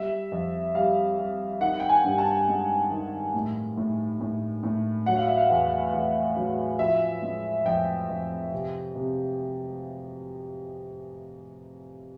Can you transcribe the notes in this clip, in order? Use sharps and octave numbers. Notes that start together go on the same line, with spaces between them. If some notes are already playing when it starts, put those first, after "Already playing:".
Already playing: G3 E5
F2
G3 F5
G3
D#3 F#5
G5
G#5
G2
A5
G#3
D#3
A2
A2
A2
A2
F#3 F#5
F5
E5
F5
E2
E2
F#3
F3 E5
G#3
F2 G5
F2
C3
C3